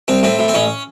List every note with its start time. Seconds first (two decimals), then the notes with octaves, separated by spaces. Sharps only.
0.08 C2 C4
0.23 A2 C4
0.39 A2
0.48 C4
0.54 A1 C#4